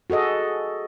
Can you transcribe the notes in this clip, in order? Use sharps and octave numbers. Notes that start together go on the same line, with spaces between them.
F#4 G#4 A4 D#5